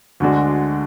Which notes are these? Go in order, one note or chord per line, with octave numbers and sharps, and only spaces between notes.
D2 D3 G#3 D4 F#4